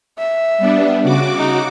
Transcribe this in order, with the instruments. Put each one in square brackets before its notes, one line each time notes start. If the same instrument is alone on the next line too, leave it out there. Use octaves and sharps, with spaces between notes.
[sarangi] E5
[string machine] G3 B3 D4
C#3 F#4 D6
[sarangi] D#4